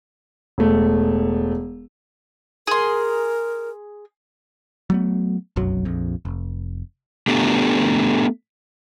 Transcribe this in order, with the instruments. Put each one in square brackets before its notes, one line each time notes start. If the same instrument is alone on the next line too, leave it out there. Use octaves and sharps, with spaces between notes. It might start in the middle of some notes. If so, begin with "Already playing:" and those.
[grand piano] E1 A3
[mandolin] G#4 C6 [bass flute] A#4
[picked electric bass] F#3 A3 B3
F1 B1 F#2 F#3
A#1 F2
F1
[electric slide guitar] A3 B3 D4 G4